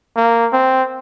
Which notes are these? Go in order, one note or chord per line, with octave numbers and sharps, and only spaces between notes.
A#3
C4